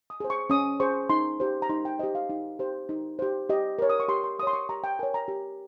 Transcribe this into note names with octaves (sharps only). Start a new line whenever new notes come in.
D#6
G#4 C5
C#6
C#4 D#6
G#4 C5 C#6
D#4 C6
G4 C5
A#5
D#4 C6
G5
G4 C5 D#5
F5
D#4
G4 C5
D#4
G4 C5
G4 D#5
A#4 C#5
D#6
C#6
G4 C6
C6
A#4 C#5 C6 D#6
C#6
G4 A#5
G5
A#4 C#5 G#5
A#5
G4